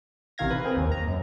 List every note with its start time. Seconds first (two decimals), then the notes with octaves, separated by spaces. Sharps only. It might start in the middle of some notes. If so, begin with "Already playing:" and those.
0.38 A1 C3 D#3 F5 G#6 A#6
0.50 B4
0.65 C4 G#4 A#4
0.77 D#2
0.92 A#5
1.07 F#2